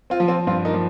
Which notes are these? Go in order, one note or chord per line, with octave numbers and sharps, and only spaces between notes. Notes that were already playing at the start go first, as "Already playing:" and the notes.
C4 F4
F3
C4 F4
G2 C4 F4
A#3 D#4
F3